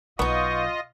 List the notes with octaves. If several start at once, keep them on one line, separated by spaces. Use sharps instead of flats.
B1 B3 D#4 F4 D#5 C#6